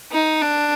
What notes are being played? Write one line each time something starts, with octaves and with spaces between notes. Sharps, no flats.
D#4
D4